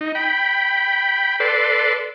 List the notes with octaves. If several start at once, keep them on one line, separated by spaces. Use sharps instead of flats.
D#4
G5 B5
A4 B4 D5 C6